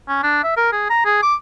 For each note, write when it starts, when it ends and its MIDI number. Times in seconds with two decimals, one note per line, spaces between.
0.09 0.23 61
0.23 0.44 62
0.44 0.53 76
0.57 0.71 70
0.72 0.87 68
0.90 1.03 82
1.06 1.21 68
1.23 1.35 86